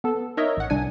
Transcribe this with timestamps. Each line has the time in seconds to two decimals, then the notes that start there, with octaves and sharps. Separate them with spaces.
0.04 B3 A4
0.37 D#4 A#4 C#5 D#5 E5
0.57 A1 F#5
0.70 C2 D4 G#5